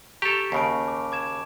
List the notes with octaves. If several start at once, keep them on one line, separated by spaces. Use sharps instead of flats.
G4 A4 A#5 C#6 F7
D#2 C#3 A5 B5 D7
D6
D6 G#6 E7